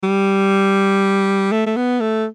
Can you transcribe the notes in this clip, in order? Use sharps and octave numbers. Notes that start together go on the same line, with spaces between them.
G3
A3
A3
B3
A3